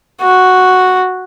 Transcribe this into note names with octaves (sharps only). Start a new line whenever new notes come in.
F#4